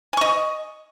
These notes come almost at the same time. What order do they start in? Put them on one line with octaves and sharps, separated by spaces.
G#5 C#6 D#5